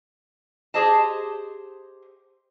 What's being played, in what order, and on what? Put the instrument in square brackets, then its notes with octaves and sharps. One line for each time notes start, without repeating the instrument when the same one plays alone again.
[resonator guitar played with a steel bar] G4 G#4 C5 D#5 A5